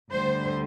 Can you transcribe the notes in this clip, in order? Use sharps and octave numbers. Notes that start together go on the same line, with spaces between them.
D2 D3 G3 C5